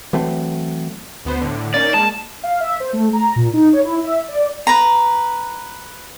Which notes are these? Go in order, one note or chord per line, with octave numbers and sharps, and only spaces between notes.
E3 F#3 A3 C4
D2 B3 C5
A2 D3
A#3 C#4 D#4 D5
G#3 A#3 A5
F5
E5
C5
A3
A#5
A#2
D#4
C#5
E4
E5
D5
B4 A#5